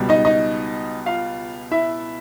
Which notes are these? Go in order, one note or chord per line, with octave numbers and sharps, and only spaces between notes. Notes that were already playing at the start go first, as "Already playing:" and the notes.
Already playing: C#2 B2 G3
D#4 D#5
D#4 D#5
F4 F5
E4 E5